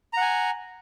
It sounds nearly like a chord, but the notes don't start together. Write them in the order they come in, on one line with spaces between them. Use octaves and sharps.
A#5 F#5 G#5